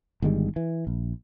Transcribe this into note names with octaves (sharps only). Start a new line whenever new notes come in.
G1 D#3 G3 G#3
E3
A#1